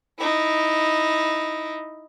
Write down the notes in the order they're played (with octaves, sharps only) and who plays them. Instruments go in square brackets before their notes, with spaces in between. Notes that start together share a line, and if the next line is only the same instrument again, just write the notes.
[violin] D#4 E4